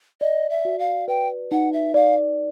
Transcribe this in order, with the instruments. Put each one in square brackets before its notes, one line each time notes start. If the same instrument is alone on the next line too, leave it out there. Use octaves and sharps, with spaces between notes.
[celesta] D5 [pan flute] D#5
[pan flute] E5
[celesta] F#4
[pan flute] F5
[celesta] B4 [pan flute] G5
[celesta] D#4 [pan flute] F#5
[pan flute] E5
[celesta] D5 [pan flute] F5